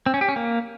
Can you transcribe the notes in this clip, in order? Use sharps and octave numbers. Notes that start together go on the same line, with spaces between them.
C4
C#4
G4
C#4
A#3